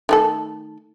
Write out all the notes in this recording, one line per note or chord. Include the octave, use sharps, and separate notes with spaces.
D#3 A3 A4